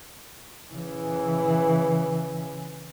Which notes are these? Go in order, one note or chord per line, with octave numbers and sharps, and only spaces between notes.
C#3 E3